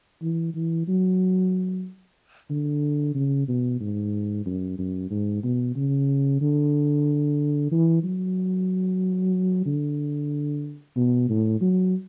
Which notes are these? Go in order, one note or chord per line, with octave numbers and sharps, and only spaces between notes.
E3
E3
F#3
D3
C#3
B2
G#2
F#2
F#2
G#2
B2
C#3
D3
E3
F#3
D3
B2
A2
F#3